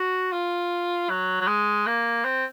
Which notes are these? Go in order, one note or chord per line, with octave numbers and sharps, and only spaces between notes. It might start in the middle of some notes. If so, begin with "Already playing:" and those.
Already playing: F#4
F4
F#3
F#3
G#3
A#3
C4